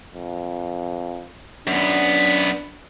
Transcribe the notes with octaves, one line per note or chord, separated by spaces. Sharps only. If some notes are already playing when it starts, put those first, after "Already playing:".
F2
F#2 B3 D4